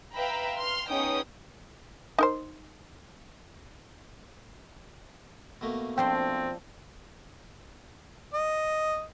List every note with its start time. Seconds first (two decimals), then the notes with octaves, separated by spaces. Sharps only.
0.15 B4 E5 F5 G5 A#5 B5
0.57 C6 F6
0.88 B3 C#4 D#4 G#4 G5 D#6
2.18 D#4 A#4 C5
5.61 B2 A3 A#3
5.98 F3 C4 D4 G5 C6
8.34 D#5